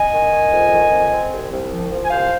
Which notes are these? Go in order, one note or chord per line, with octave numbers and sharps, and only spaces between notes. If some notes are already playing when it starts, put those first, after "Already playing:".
Already playing: D#5 G#5
D#3
D#3
F2
D#3
F2
C4
C2
C2
F3
F3
G#5
C2 C5 F5